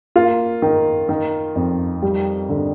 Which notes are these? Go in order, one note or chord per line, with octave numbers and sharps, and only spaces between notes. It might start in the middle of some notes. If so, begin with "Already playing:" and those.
A#3 F4
D#3
D#3
F2
G3
D3